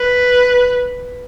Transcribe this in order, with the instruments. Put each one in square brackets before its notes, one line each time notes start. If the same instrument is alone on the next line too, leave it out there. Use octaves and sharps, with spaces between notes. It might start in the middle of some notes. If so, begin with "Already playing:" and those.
Already playing: [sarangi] B4